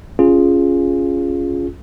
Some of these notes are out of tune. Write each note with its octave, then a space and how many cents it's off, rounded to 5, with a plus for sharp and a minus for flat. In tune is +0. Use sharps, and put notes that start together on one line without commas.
C#4 +0 F4 -5 G#4 +0